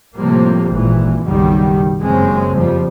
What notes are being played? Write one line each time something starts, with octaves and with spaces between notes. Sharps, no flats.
A2 C3 F3 G3 A#3
G#1 A#2 E3
F#1 B1 B2 D#3 G3
F#1 F#2 C#3 G#3 C4
F2 F3 G3